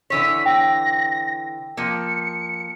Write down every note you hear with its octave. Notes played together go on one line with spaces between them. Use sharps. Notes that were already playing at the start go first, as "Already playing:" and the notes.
D3 E3 C#5 B6
G5 A#6
F3 A#3 C#7